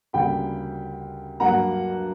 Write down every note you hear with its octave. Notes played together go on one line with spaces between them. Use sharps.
D2 C#3 G3 A#3 G5 B5
G2 F#3 A#3 F#5 A#5